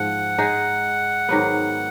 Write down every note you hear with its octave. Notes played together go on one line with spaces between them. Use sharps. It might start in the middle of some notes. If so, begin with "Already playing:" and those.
Already playing: G#2 F3 F#5
G#3 D#4 G#4
G#2 D#3 F#3 B3